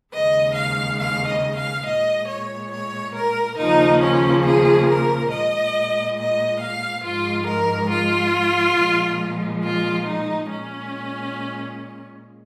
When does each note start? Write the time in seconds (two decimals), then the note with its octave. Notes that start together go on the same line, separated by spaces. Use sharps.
0.13 D#2 C#3 G#3 D#5
0.56 F5
0.99 F5
1.28 D#5
1.57 F5
1.86 A#2 G#3 D#5
2.29 C#5
2.71 C#5
3.14 A#4
3.58 D#2 C#3 F3 A#3 D#4
4.02 C#4
4.45 G#4
4.88 A#4
5.31 A#2 G#3 D#5
6.17 D#5
6.60 F5
7.03 G#2 F3 G#3 F4
7.46 A#4
7.90 F4
8.76 A#2 F3 G#3
9.62 F4
10.06 D#4
10.49 A#2 G#3 C#4